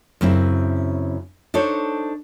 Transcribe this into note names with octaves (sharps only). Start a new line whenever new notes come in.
F#2 C#3 C4 E4
D4 D#4 A4 C5 C#5